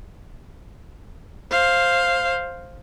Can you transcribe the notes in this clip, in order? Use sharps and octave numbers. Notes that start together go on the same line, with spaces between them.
C5 F5